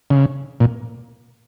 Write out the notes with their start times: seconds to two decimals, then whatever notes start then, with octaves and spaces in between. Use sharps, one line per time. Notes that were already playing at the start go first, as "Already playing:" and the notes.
0.10 C#3
0.60 A#2